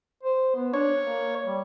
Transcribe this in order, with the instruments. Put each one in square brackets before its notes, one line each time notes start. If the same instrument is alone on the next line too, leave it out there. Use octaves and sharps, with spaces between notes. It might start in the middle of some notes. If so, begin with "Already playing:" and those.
[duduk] C5
B3
[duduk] D4 [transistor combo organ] C#5
[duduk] A#3
G3